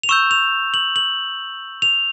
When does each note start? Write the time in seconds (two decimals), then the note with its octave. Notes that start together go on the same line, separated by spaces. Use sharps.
0.03 F7
0.09 C#6 E6 G6 E7
0.31 F7
0.74 F#7
0.96 F#7
1.82 F7